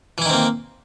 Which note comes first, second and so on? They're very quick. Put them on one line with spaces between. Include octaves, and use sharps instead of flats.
E3 E4 D#3 C4 A#3